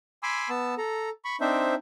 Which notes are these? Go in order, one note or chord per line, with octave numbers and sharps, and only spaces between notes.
G#5 B5 C6 D6 E6
B3 A5 E6
A4 A#5
B5 C#6
C4 D4 D#4 C5 E5